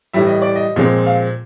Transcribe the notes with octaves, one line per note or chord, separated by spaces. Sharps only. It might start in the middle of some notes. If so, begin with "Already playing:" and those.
A2 E3 G3 E5
D#5
D5
D#5
A#2 F3 G#3 C4
F5